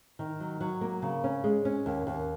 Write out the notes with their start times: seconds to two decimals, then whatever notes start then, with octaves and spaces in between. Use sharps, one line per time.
0.19 D#3
0.40 F#3
0.61 F#3
0.81 A#3
1.02 C#3
1.24 C#4
1.44 G#3
1.65 C#4
1.86 D#2
2.07 D#2